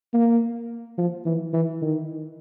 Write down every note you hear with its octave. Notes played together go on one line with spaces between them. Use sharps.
A#3
F3
E3
E3
D#3